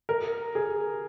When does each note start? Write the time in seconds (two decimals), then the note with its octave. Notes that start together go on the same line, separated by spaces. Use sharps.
0.09 A#4
0.55 G#4